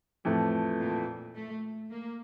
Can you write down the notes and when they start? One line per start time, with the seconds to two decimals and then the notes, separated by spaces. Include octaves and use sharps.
0.25 F2 A2 E3 A3
0.80 A#2
1.35 A3
1.90 A#3